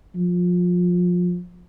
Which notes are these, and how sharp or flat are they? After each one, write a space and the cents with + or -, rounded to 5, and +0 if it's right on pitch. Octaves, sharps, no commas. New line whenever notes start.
F3 +25